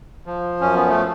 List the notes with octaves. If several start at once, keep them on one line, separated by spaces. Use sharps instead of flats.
F3
F#2 C#4
B3
A3